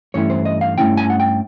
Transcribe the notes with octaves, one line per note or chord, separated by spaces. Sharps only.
G2 E3 A3 C#4 E4 C#5
C5
D#5
F5
G2 E3 A3 C#4 E4 G5
G#5
F#5
G5